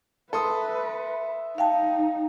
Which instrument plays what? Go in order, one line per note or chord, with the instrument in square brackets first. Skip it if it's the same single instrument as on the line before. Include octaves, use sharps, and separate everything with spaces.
[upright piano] A4 C6 D#6 [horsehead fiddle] B4 [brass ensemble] E5
[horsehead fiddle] D#4 [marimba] F5 G5 A5